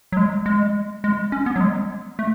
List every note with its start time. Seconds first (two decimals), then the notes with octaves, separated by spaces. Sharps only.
0.12 F#3
0.17 G#3
0.46 G#3
1.04 G#3
1.32 C#4
1.46 B3
1.56 F#3
1.61 G#3
2.19 A3